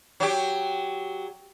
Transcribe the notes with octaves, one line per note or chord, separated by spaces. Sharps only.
F#3 G4